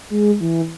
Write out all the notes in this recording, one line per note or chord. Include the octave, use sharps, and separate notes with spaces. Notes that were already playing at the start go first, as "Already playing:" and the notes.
G#3
E3